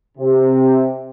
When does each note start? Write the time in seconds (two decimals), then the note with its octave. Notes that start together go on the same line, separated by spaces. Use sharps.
0.18 C3